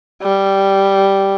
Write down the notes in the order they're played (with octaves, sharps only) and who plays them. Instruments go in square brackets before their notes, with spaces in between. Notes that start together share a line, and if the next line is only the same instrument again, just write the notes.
[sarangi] G3